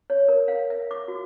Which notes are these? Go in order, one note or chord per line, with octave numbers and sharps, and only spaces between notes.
C#5
A#4
F5
E5
D6
F#4